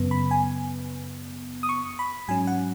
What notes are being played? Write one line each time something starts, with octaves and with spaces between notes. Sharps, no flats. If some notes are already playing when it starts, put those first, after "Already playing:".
Already playing: F#2 C#3 B3
B5
G#5
D#6
C#6
B5
G#2 F#3 C#4 G#5
F#5